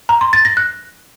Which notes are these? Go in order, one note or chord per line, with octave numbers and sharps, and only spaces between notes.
A#5
C6
A6
A#6
F#6